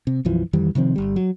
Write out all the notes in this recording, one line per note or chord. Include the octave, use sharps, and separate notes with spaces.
C3
B1 F#2 E3 F3
F2 D#3 E3 G3
C3 D#3 F3 C4
G1 G3
F#3